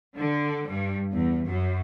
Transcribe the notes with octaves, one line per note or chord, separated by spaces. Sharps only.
D3
G2
E2
F#2